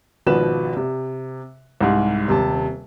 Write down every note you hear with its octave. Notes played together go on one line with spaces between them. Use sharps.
G#1 B2 F3 B4 E7
C3
C2 G#2 G3
D#1 C3 A5